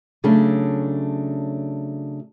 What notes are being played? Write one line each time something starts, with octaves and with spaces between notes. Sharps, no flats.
C#3 F#3 A3 D4